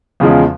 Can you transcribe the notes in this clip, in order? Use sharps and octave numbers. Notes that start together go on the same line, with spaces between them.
E2 C#3 F3 G#3